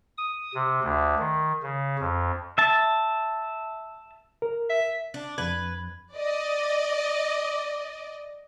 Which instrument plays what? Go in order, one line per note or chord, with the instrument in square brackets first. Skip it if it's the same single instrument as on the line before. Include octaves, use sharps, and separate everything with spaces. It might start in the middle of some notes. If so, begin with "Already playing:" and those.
[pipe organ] D#6
C3
D2
D#3
C#3
F2
[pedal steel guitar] E5 A5
[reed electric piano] A#4
[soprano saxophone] E5
[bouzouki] D4
[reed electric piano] F2 G#6 [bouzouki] B4
[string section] D5 D#5